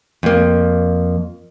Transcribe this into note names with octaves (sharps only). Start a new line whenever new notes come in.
F2 A#3